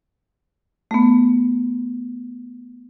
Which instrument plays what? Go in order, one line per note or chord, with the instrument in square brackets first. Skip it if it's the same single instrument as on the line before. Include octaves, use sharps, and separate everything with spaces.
[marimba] A3 B3